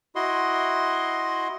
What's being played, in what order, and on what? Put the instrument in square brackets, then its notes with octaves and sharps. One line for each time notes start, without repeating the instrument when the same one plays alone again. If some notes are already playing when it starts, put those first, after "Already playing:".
[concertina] E4 F#4 D#5 C6